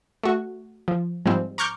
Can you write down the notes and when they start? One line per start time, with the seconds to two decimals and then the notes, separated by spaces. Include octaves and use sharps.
0.23 A3 F#4
0.88 F3
1.25 G#2 F3 G3 C4
1.58 A#5 C#6 D6 F6 G6